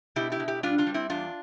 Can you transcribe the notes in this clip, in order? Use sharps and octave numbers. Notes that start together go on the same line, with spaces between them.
B2 E4 G4
E4 G4
B2
E4 G4
G3 D4 F4
D4 F4
G3
C4 E4
E2 D4 F4